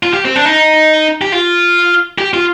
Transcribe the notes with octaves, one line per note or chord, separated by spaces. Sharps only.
F4
G4
C4
D4
D#4
G4
F4
G4
F4